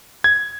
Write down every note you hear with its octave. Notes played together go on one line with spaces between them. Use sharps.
G#6